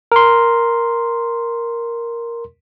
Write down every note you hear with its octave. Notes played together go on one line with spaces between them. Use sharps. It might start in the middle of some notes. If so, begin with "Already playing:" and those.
A#4 C6